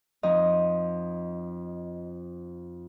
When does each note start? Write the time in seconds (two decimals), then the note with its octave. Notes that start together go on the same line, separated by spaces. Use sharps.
0.23 F2 F3 D#4 D#5